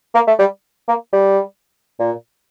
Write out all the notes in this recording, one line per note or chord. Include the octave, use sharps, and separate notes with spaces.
A#3
A3
G3
A#3
G3
A#2